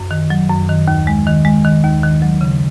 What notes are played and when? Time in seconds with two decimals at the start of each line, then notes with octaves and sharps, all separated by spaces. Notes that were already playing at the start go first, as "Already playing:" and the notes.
Already playing: F#2
0.11 D#3
0.30 F#3
0.50 F#2
0.69 D#3
0.88 D#2
1.07 G#3
1.27 D#3
1.45 G#3
1.65 D#3
1.84 D#2
2.03 D#3
2.22 F#3
2.41 C#3